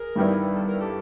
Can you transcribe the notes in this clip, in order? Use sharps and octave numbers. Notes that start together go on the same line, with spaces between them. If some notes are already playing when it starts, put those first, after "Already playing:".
Already playing: G#4 A#4
G2 D#3 G3 B3 E4
A4
A#4
G4 A4